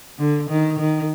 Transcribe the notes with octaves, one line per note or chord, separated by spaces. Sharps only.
D3
D#3
D#3